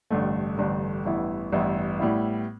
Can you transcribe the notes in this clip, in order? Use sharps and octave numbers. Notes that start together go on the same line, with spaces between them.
A1 G2 D3 A3
A1 G2 D3 A3
A1 G2 E3 B3 E4
A1 G2 E3 B3 E4
A2 G3 B3 E4